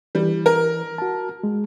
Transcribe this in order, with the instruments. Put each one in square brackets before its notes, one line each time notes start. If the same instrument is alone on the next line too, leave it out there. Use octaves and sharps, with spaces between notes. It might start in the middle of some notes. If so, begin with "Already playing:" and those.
[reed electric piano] E3 [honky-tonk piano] G3
[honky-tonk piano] A#4
[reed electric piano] F#4 A5
G#3